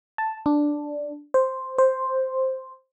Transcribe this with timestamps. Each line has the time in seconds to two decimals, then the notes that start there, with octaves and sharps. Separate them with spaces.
0.18 A5
0.46 D4
1.34 C5
1.78 C5